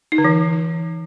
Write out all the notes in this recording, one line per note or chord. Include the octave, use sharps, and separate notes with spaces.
D#4
D3
E3